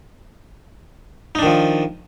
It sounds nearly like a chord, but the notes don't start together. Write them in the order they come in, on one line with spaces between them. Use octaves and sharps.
D#4 D4 D#3 F3